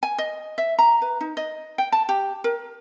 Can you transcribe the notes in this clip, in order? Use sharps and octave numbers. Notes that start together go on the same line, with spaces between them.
G#5
D#5
E5
A#5
B4
D#4
D#5
G5
A5
G4
A#4